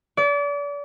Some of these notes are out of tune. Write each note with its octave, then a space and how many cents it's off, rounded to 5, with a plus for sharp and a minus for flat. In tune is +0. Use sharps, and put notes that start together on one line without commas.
D5 -35